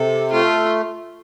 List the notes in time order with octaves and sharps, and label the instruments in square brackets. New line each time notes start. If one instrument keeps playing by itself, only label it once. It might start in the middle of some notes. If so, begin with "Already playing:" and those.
Already playing: [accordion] C3 [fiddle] A4
[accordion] A3 [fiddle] F4